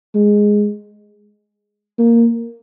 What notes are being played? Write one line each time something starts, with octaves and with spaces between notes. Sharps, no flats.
G#3
A#3